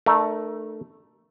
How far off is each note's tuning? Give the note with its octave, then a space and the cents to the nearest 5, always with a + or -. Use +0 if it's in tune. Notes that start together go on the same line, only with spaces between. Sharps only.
A3 +0 D4 +45 A#4 +15